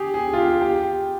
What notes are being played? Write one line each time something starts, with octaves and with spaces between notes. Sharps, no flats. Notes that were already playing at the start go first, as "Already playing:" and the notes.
Already playing: G4 G#4
G#4
F4
G4
G4